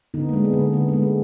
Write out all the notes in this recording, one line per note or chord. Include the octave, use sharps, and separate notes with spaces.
D3 B3 D#4
G#3 A#3 D4
B3
D3
B3
D3 A#3
G#3 B3
B3